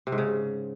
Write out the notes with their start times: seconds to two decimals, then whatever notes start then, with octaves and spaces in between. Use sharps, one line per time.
0.07 C3
0.12 G#2
0.18 C#3